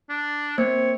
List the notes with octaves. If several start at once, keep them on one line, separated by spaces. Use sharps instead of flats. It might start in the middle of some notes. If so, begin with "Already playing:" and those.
D4
A#3 C4 C#5